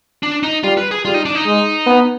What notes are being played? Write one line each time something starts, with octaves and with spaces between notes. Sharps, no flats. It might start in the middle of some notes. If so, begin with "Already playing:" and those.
D4
D#4
G3 F4
B4
G#4
G3 F4
D#4
D4
D#4
G#3
B3